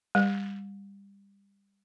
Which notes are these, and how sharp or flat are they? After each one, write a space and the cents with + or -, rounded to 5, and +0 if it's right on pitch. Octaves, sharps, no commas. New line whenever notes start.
G3 +25